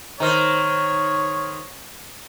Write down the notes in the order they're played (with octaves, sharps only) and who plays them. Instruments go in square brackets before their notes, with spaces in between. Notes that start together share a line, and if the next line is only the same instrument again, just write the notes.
[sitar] D#3 C5 [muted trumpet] C#5 [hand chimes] A#5 F6